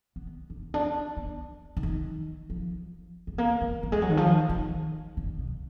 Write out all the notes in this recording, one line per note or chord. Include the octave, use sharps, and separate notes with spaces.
B3
D4
B3
D4
B3
D3
D#3
F3
G#3
A#3
G#3
F#3
G#3
F#3
D#3
F3
D#3
D3
B2